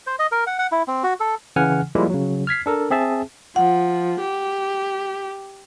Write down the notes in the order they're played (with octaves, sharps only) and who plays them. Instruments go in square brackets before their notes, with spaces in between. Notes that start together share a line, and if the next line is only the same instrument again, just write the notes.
[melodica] C5
D#5
A#4
F#5
F#5
E4
C4
F#4
A4
[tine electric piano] C#3 E3 F#5 G#5 F6
F3 G3 G#3 A#3 E4 F4
C#3 F#3
F6 G#6 B6 C7
D4 A4 A#4
C4 G#4 E5 A5
[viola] F3 [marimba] F#5
[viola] G4